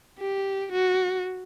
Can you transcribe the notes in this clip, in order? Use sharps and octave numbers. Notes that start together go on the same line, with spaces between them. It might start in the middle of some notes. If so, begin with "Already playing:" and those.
G4
F#4